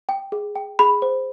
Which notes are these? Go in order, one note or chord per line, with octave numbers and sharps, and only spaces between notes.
G5
G#4
G5
G#4 B5
C5